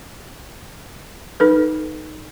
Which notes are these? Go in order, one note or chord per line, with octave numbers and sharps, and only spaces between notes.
D#4 A4 B4